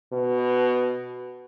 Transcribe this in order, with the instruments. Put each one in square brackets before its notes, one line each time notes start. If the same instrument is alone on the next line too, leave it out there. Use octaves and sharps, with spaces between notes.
[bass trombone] B2